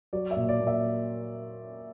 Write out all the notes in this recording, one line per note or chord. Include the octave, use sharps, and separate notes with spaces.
F#3 D5
E5
A#2
D5
A#2
E5